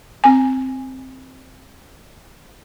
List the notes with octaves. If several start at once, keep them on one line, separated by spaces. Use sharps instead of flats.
C4 G#5